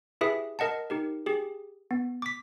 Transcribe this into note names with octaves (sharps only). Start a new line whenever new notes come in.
E4 G4 G#4 B4 E5 D#6
A#4 D#5 F#5 A5
D#4 G4 A#4
G4 G#4
B3
D6 B6